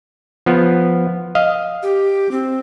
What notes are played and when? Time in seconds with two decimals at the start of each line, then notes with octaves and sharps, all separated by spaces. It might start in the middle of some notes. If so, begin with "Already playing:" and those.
0.46 F3 B3
1.35 D#5 F5
1.83 G4
2.31 C4